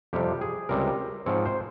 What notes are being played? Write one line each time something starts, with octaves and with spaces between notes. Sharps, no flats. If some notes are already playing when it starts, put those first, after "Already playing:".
F2 C3 G3 G4
G#4
C#2 C3 G3 C4 A#4
G#2 F3 C4 C#5
C5